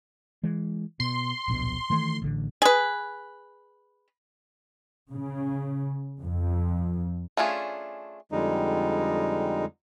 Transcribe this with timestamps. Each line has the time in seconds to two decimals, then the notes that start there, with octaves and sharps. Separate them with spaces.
0.44 E3 G#3
1.00 B2 C6
1.48 D1 A#1 B2
1.90 D#3 E3 A3
2.22 A1 D3
2.62 G#4 B4
5.10 C#3
6.22 F2
7.37 A3 C#4 D4 F4 G#4
8.32 F2 D3 G3 G#3 D#4